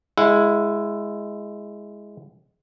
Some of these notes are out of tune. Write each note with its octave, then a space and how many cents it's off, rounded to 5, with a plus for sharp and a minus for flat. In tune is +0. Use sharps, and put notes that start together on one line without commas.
G#3 +0 E4 +10 F#5 -30